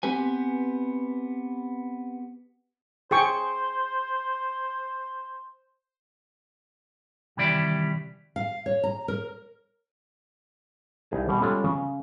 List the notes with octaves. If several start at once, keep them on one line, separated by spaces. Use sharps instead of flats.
B3 C4 G4 B4 G#5
G#4 C5 G5 C#6
C3 D#3 E3 G3 D5 E5
F5
C#5
A#5
A#4
C2 D#4 G#4 A5
B2 G3
G3 G#3 C#4 F4 A4
C#3